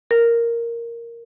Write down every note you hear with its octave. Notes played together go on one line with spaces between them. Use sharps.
A#4